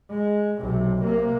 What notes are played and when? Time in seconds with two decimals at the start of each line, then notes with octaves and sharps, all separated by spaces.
0.10 G#3
0.61 B1 C3
1.00 C3 A#3